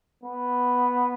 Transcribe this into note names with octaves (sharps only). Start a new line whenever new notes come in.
B3